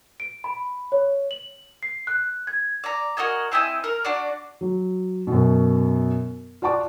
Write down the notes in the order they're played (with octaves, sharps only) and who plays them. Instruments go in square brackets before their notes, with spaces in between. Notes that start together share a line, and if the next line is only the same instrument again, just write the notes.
[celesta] D7
B5
C#5
F#7
C7
F#6
G#6
[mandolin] D5 A#5
F#4 A#4 D#5 G#5
C4 E4 D#5 G#5
A#4
D4 F#4 D5
[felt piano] F#3
F#2 B2
F4 D5 F#5 A5 C#6 D6